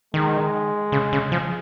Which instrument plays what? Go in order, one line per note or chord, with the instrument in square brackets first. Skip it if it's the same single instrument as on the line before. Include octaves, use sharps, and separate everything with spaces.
[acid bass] D#3 [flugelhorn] G#3
[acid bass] C#3
C#3
F3